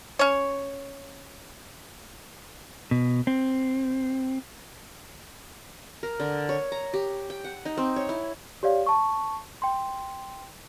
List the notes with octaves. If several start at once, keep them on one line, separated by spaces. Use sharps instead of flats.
C#4 C#5
B2
C4
A#4
D3
C#5
A#5
G4
G5
F#5
D#4
C4
C#5
E4
G4 C#5 D5 F5
A5 C#6
G5 C6